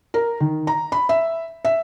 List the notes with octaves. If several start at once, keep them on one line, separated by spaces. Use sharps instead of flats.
A#4
D#3
A#5
B5
E5
E5